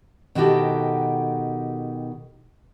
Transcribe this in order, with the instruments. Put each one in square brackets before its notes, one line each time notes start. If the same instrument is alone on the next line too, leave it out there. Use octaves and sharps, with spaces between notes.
[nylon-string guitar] B2 D#3 E4 F#4 G4 A4